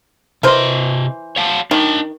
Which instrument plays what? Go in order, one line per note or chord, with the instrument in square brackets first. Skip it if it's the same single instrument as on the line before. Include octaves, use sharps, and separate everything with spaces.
[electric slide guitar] C3 D#5 [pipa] E3 A#4 C5
[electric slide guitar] C#5 F5 A5
[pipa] D#3 [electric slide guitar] D4 D#5 A5